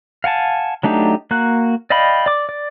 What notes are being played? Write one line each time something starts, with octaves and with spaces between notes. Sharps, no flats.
F5 F#5 G#5 A5
F#3 A3 D4 D#4 G4
A#3 F#4 F#6
D5 D#5 F5 G5 B5
D5 D6
D5